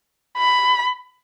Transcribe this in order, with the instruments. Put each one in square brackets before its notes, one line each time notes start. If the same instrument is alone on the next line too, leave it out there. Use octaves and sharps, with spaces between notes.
[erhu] B5